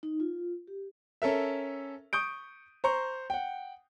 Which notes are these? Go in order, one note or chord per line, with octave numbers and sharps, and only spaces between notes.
D#4
F4
G4
C#4 A4 A#4 E5
C#6 D#6 G6 D7
C5 A#5 C6 C#6
F#5 G5